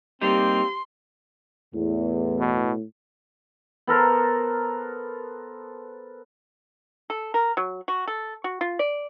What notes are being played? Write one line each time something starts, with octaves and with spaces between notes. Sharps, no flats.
G3 A#3 C4 D#4 G4 C6
E2 A2
B2
B3 A4 A#4 C5
A4
A#4
F#3
F#4
A4
F#4
F4
D5